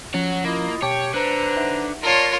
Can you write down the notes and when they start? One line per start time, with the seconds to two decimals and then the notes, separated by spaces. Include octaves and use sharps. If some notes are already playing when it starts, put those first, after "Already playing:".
0.14 F3 C#4 C#5 F#5
0.44 A#3 E4 F4 D#5
0.82 B2 G4 C#5 G5 A5 D6
1.14 D3 B4 C5 A#5 F#6
1.57 D#4 E5 F#5
2.03 F4 A#4 C#5 D5 A5 C6